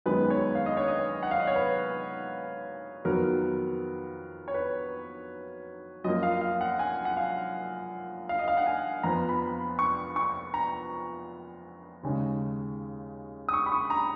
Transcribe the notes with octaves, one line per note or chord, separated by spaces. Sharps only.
F#2 D#3 G#3 B3 B4
B4
C#5
F5
D#5
C#5
D#5
F#5
F5
D#5
C#5
B4
F2 D#3 F#3 B3 A#4
C#5
B4
F#2 F3 A#3 D#5
F5
F5
F#5
G#5
F#5
F5
F5
D#5
F5
F#5
G#5
F2 F3 B3 A#5
B5
C#6
C#6
A#5
D#2 C#3 G#3
D#6
C#6
B5
C#6
A#5